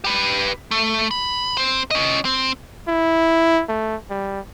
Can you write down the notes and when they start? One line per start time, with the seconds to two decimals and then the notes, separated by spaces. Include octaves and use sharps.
0.04 G4 B4
0.71 A3
1.11 B5
1.57 C4 C5
1.91 C#4 D#5
2.25 C4
2.88 E4
3.69 A3
4.10 G3